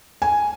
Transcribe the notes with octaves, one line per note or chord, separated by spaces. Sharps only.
G#5